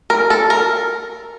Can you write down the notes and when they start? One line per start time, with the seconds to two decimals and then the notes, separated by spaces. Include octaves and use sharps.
0.10 A#4
0.30 A4
0.50 A#4